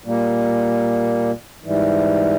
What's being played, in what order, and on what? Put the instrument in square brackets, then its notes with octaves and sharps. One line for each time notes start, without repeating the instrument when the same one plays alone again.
[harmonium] A#2 G3 A#3
G#2 E3 G3